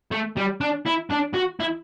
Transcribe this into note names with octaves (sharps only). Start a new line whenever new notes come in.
A3
G3
D4
E4
D4
F#4
E4